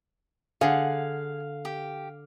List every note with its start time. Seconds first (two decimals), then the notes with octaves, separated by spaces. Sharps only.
0.61 D3 G#4 F5 F#5
1.65 G4